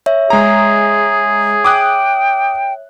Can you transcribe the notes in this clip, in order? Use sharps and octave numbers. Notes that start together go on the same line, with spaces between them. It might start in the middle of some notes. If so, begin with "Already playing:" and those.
C#5 E5
G#3 G#4 A#5
G5 D6 D#6 F#6